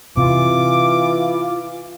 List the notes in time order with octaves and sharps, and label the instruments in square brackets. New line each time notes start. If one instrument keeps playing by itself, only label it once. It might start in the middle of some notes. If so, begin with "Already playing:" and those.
[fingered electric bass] C3 [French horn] E3 [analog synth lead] F4 [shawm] D6